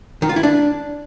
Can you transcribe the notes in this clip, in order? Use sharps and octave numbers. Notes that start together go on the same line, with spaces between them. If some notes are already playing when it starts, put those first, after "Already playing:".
D#3
F4
E4
D4